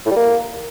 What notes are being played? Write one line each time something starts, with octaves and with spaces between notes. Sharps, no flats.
A2
G3
A#3